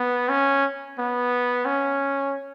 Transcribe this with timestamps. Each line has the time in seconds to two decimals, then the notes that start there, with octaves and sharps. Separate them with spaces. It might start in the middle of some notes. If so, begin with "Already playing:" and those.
Already playing: B3
0.29 C#4
0.98 B3
1.65 C#4